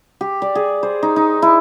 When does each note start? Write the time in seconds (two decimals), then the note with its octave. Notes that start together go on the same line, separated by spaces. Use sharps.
0.21 G4
0.42 D5
0.55 G#4
0.83 C5
1.03 D#4
1.16 D#4
1.42 E4